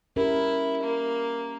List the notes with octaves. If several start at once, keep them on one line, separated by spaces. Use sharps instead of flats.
C#4 E4 G4 A#4
A#3